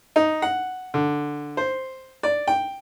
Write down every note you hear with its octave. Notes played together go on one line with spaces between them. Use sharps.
D#4
F#5
D3
C5
D5
G5